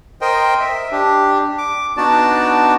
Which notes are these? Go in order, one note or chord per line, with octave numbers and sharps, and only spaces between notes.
A#4 C5 D#5 G5
E5
D4 G4
D6
B3 D4 D#4 F#4 D5 A5